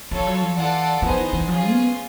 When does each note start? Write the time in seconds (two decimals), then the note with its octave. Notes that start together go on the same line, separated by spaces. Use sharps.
0.11 F3 F4 A4 C#5
0.27 F#3
0.42 F3
0.57 E3 F4 A4 D5 F#5 A5
1.02 F3 B3 D#4 G#4 C5
1.18 E3
1.33 E3
1.48 F3 C#4 F4 G#4
1.71 B3